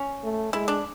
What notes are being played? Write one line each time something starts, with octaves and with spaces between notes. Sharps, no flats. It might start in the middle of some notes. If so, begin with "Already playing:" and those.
Already playing: C#4
A3
G#3 E4
D4